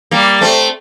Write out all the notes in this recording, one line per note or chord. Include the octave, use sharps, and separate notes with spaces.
G3 A#3
A3 C4